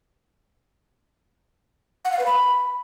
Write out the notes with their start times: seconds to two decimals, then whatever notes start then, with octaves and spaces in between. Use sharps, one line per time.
2.05 F#5
2.12 F5
2.19 B4
2.26 B5